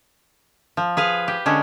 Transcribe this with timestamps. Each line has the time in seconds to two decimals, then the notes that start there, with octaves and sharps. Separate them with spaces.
0.77 F3
0.97 G#4 B4 F5
1.28 G4
1.46 D3 G#3 C#4